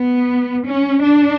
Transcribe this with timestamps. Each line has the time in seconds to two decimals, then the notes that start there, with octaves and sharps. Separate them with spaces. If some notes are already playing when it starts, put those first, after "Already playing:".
Already playing: B3
0.66 C#4
1.02 D4